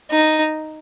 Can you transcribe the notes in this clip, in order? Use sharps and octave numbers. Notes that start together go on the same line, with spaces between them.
D#4